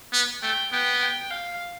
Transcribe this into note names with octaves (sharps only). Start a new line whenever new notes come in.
B3
A3 G5
B3 G5
G5
F5